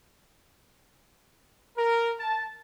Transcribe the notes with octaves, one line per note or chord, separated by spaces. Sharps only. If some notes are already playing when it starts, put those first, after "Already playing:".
A#4
A5